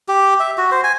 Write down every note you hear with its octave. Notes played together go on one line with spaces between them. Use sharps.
G4
E5
F#4
C5
G#5